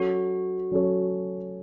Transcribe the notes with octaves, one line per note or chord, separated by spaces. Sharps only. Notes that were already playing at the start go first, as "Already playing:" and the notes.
Already playing: F#3 C#4 F#4 A4 C#5
F#3 C#4 A4 C#5